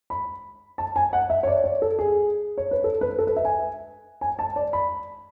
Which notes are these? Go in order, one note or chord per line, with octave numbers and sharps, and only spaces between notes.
B5
A5
G#5
F#5
E5
C#5
D5
C#5
A4
G#4
C#5
B4
A4
B4
A4
B4
E5
G#5
G#5
A5
D5
B5